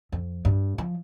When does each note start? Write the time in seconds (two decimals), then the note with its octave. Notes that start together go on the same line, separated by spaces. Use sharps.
0.12 F2
0.45 G2
0.78 F3